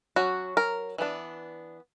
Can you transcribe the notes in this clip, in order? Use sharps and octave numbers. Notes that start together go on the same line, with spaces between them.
F#3 C#4 F#4
A#4
E3 B3 D4